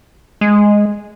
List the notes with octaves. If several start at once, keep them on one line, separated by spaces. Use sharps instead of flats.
G#3